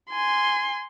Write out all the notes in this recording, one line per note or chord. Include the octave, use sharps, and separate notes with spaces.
G#5 C6